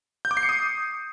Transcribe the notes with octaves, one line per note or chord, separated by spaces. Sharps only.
G6
D6
C7
C#7
D#6